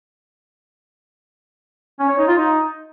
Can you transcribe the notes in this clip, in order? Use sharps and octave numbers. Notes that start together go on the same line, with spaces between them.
C#4
C#5
D#4
F4
D#4